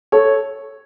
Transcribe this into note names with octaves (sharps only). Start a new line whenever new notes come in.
A4 C#5